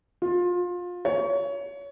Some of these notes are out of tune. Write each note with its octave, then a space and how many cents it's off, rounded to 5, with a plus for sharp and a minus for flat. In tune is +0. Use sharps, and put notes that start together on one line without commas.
F4 +25
C#5 +25